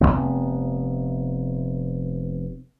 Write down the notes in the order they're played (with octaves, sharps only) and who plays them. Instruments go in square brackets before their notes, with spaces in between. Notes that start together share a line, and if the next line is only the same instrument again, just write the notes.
[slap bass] F1 A2 C3 B3